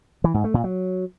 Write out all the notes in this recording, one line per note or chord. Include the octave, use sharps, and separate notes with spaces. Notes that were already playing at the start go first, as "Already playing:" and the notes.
E3
G#2
A3
A#2
F#3